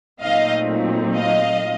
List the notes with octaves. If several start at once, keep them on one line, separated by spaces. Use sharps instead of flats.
A#2 F#3 A3 C4 D#4 D#5 F5
D#5 F5